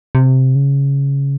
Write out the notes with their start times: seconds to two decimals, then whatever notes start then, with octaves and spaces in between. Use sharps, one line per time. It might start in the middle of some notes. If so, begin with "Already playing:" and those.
0.15 C3
0.55 C#3